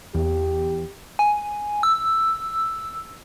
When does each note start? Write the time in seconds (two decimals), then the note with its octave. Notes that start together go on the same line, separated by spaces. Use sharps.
0.15 E2 G4
1.19 G#5
1.83 E6